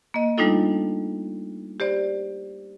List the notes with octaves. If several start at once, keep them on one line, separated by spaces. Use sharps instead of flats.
A#3 D#5
G3 A3 D4 D#4 F4 A4
G4 C5 D5